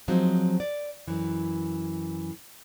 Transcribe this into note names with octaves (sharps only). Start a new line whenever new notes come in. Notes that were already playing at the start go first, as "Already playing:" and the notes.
F3 F#3 G#3 C4 D#4
D5
F#2 E3